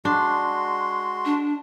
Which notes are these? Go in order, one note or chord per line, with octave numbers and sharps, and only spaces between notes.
G#3 D4 F#4 C6
D4